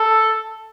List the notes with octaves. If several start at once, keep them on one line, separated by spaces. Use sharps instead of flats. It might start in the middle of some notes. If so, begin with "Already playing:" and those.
Already playing: A4